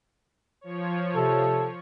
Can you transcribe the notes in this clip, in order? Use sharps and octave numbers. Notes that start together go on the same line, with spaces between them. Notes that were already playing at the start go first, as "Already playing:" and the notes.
F3 C#5
C3 A4